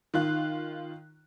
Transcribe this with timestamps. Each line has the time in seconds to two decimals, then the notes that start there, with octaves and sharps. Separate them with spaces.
0.14 D#3 F4 F#6